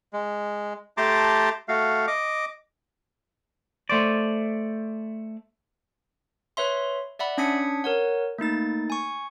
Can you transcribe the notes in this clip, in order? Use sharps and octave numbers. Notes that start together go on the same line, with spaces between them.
G#3
A3 G4 A5 A#5 C6 D6
A3 F#4 F5
D#5 D6
A3 C5 D5
B4 C#5 E5 C6
D5 E5 F#5 B5
C#4 D4 D#6 G#6 B6 C#7
A#4 C#5 F#5
A3 A#3 D#4 A6
G#5 C#6